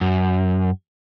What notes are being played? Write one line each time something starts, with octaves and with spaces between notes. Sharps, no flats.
F#2